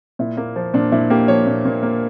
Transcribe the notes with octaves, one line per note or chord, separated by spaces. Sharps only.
A#2 E4
A#3
F3
A#2 D4
A#2 E4
A#3 G4
F3 C#5
A#2
A#2
A#3